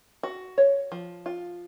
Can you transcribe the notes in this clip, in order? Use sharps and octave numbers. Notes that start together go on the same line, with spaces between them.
F#4
C#5
F3
F4